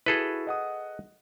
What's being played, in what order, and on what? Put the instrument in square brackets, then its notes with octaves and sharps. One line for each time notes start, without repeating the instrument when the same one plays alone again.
[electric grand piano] E4 F#4 [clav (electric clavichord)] G#4 A4 B4
[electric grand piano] D#5 F#5 D#6